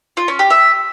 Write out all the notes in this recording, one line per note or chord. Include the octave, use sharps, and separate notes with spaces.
F4
C#4
G4
E5